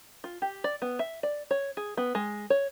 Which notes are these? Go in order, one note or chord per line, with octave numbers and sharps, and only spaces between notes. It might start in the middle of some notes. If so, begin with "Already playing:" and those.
F4
G4
D5
B3
E5
D5
C#5
G#4
B3
G#3
C#5